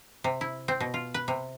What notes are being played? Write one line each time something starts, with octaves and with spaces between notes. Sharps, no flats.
C3
E4
C4
B2
F4
B4
C3